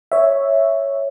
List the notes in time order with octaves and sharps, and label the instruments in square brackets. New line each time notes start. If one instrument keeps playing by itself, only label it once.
[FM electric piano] C#5 E5